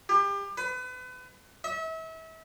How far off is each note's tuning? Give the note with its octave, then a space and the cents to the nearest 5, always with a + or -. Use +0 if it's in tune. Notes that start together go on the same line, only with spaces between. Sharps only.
G4 +30
B4 +35
E5 -35